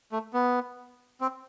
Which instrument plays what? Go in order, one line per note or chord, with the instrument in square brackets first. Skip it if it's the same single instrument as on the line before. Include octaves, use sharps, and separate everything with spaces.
[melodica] A3
B3
C4